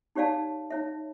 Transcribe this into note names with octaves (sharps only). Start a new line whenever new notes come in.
D#4 G4 C#5 D5 F5 A5
D#4 C#5 E5